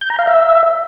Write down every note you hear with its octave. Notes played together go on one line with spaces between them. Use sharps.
G6
A#5
F5
E5